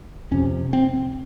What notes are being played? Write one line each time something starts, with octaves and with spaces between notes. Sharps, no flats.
F2 C3 C#4
C4